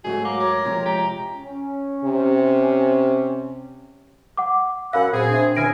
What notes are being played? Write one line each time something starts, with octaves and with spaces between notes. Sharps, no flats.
G#2 F#3 A3 F#4 G#4
A#3 D6
A#4 C#5
C3 F3 G#3 A#5
G4 A#5
C#4
C3
F#5 D6
F#2 F5 F#5 G#5 B5 E6
A#2 C4 G#4
D4 E5
C#2 D3 E4 G#5 F6 A#6 D7